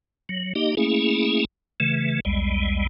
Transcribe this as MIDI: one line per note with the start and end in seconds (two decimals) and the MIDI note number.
0.29 0.53 54
0.55 0.75 58
0.55 0.75 63
0.55 0.75 67
0.55 0.75 75
0.77 1.45 57
0.77 1.45 58
0.77 1.45 61
0.77 1.45 64
0.77 1.45 68
1.80 2.20 49
1.80 2.20 52
1.80 2.20 57
2.25 2.87 35
2.25 2.87 40
2.25 2.87 55
2.25 2.87 56